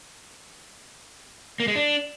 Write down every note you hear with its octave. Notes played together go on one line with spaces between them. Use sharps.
A#3
G#3
D4